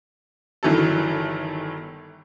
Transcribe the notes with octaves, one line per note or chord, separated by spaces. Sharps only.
G1 D#3 E3 F#3 A4